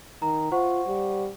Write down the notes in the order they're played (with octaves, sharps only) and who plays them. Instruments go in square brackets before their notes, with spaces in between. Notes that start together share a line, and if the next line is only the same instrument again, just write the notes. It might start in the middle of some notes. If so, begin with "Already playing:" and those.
[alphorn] D#3 [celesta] A#5
[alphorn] F4 [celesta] C5 F#5 C#6
[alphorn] G3